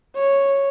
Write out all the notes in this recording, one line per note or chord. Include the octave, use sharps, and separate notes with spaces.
C#5